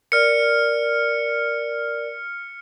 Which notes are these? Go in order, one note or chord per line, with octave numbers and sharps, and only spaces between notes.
A#4 D5 F6 C#7